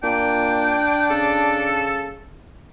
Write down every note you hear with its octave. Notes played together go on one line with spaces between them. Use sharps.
A#2 D4 G5
C#3 A4